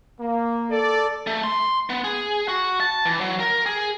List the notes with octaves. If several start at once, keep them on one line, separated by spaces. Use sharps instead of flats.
A#3
A4 D5
A3
C6
B3
G#4
F#4
A5
E3
F#3
A#4
G#4